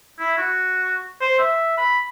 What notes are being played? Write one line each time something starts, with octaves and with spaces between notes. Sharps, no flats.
E4
F#4
C5
E5
B5